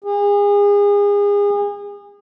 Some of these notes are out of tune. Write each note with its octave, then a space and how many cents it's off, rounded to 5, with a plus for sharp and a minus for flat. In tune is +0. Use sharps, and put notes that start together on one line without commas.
G#4 -35